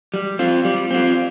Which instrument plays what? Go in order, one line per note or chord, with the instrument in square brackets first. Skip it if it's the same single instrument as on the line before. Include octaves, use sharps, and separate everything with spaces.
[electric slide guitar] G3
C4 F4
G3
C4 F4